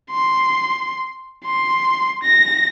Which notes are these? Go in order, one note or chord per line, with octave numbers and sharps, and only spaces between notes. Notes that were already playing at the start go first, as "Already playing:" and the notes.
C6
C6
A#6